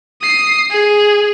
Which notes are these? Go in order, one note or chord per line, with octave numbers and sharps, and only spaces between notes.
D#6 C7
G#4